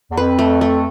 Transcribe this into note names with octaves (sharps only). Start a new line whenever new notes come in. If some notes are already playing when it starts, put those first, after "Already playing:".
E2
F2 B4
A3
A3